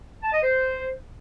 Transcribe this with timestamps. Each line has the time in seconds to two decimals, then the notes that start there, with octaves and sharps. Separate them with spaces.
0.22 A5
0.32 D#5
0.43 C5